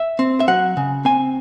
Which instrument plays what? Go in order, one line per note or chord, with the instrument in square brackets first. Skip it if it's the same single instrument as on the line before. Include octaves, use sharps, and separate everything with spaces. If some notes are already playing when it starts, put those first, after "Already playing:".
Already playing: [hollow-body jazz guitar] E5
C4
E5
F#3 F#5
C#3
C4 G#5